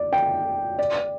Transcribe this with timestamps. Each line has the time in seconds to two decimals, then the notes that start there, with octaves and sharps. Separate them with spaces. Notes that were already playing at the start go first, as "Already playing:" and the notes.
Already playing: D5
0.13 G5
0.79 D5